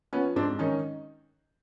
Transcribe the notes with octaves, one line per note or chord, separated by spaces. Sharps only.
F3 B3 C#4
G#2 C4 D4
D#3 C#4 D#4